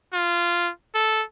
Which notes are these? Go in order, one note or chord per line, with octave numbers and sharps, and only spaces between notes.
F4
A4